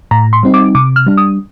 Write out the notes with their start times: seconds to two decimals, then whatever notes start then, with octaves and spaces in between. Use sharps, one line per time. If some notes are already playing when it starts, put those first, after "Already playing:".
0.11 A2 A#5
0.33 C6
0.43 G3 C4 D#4
0.54 D6
0.75 C3 D6
0.96 F6
1.07 G3 D4
1.17 D#6